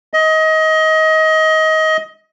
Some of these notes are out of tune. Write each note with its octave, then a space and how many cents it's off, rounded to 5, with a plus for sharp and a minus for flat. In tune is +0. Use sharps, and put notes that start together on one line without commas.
D#5 +25